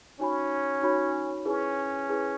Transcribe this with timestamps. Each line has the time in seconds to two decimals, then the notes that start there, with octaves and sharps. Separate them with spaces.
0.20 C#4 D#4 F#4 C#5 G#5 B5
0.82 D#4 F#4 C#5 G#5 B5
1.45 C#4 E4 G#4 B4
2.08 E4 G#4 B4